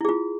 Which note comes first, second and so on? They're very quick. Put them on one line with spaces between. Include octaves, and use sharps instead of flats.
E4 G#4 F4